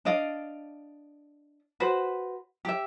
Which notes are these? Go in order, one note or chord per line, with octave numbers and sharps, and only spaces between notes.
D4 D5 D#5 F5
F#4 B4 C5
G4 E5